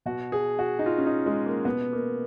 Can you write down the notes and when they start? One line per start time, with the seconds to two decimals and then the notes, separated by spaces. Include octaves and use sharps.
0.06 B2 F#4
0.32 G#4
0.59 F#4
0.79 D#4
0.86 F4
0.98 C#4
1.06 D#4
1.26 G#3
1.46 A#3
1.65 B2 B3
1.93 A#3